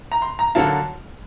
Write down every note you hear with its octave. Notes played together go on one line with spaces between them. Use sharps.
A#5
C6
A#5
D3 F#3 A#3 A5